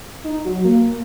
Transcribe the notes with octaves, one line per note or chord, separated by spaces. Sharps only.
D#4
F#3
A#3